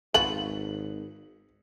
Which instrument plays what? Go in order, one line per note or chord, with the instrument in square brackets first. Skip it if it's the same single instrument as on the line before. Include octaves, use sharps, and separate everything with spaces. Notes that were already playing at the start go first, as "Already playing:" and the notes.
[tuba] G#1 [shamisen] B3 F4 F#4 [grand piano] F#7